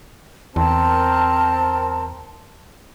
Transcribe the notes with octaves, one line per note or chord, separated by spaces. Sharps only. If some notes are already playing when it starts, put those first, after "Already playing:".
E2 C4 A#4 A5